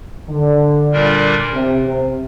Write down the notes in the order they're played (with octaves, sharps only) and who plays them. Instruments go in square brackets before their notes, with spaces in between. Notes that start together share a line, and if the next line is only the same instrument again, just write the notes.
[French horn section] D3
[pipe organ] A#2 G3 D4 F4 A#4
[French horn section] C3
C3